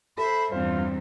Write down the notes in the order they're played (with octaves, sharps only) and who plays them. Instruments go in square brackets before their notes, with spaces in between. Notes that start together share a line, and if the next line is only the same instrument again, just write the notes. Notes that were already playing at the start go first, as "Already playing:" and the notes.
[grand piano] A4 [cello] C5 E5 [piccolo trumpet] B5
[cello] E2 G2 [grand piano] C4 C5 [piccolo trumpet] F4